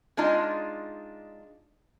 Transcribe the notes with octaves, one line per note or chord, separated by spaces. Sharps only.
G#3 D4 D#4 F4 D#5